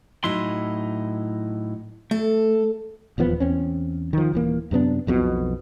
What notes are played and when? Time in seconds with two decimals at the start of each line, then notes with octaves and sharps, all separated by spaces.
0.24 A2 F#3 D#4 E4 C6
2.11 A3 A4
3.18 D#1 E2 F3 B3
3.40 E2 C4 C#4
4.13 D#3 F3
4.33 D#1 E3 A#3
4.71 F#2 C3 B3 D4
5.07 B1 F2 B2